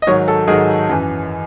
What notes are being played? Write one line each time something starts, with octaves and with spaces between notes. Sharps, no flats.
D#5
G#2 D#3 F#3 C#5
A4
G#2 D#3 F#3 G#4
F#2 E3